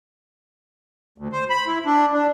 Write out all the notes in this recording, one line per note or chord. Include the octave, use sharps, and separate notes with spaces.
D2
C5
B5
E4
D4
D4